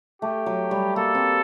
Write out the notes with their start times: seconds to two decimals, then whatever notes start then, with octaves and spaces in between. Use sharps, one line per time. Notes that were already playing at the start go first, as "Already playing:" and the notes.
0.22 A3 G4
0.46 F#3
0.71 G3
0.96 A#3 A4
1.15 C4